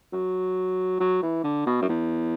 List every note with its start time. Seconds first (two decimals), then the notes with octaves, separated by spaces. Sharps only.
0.12 F#3
1.00 F#3
1.22 E3
1.44 D3
1.66 B2
1.82 F#2
1.89 E2